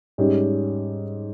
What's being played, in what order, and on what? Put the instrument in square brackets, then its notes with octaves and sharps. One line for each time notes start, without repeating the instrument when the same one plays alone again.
[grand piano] G#2 G3 C#4 G4